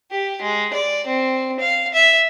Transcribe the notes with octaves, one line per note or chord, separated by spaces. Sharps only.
G4
G#3
D5
C4
F5
E5